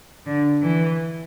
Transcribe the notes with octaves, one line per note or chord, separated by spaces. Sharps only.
D3
E3